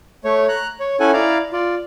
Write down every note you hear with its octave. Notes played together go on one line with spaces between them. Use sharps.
A3 C#5
A#5 F#6
C#5
C#4 E4 A4 F#5 G#5
E4 D5 F5 A#5
F4 D5